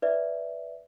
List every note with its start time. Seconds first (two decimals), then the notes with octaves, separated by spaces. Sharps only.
0.02 B4 D5 E5